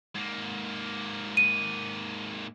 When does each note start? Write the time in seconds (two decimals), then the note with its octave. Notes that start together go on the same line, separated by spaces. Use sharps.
0.15 G#2 A#3
1.37 D#7